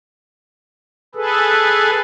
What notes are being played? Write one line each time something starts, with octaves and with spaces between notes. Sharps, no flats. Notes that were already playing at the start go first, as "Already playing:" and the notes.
G#4 A4 B4